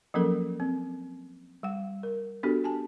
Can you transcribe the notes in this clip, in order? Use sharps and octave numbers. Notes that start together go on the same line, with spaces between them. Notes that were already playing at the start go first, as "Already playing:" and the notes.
F3 F#3 A#3 C#4 A4 A#4
C4
G3 F#5
A#4
B3 D4 F#4 G4 A4
G#5 A5